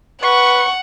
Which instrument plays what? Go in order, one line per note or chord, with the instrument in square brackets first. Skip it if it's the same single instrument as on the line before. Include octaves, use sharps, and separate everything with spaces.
[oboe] B4 [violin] F#5 [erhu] C#6